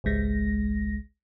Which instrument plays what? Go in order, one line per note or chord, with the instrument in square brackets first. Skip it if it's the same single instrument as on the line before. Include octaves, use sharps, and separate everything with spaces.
[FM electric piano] G#1 C#2 G#3 A#6